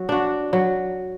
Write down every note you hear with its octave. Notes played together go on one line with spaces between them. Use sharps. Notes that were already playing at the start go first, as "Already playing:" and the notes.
Already playing: F#3
D4 F#4
F#3